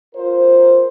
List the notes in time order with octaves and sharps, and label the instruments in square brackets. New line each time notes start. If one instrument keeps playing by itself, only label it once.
[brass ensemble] F4 A#4 C5